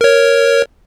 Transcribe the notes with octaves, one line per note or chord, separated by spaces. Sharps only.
A#4 C#5